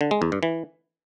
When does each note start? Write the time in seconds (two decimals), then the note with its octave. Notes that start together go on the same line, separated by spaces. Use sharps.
0.01 D3
0.11 G#3
0.22 E2
0.32 G2
0.43 E3